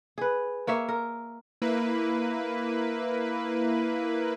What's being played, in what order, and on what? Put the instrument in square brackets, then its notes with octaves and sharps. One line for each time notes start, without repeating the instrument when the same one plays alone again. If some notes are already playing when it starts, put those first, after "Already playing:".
[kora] G#4 B4
A#3 C#5 E5
A#4
[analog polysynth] A#3 E4 B4